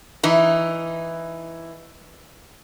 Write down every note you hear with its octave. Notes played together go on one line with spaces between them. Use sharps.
E3 D#4